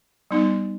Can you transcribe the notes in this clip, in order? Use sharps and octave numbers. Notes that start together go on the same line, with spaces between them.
G3 B3 D#4